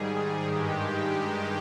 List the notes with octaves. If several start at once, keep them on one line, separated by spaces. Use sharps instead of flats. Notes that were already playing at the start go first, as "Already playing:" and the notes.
Already playing: G#2 D#3 G3 G#4
G2 D#3 G#3 G4